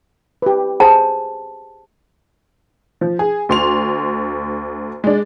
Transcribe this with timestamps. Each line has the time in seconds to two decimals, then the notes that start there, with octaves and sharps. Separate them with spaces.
0.42 G4 B4
0.80 G#4 C5 A5
3.01 F3
3.19 G#4
3.49 D2 C6 F7
5.04 G#3 D4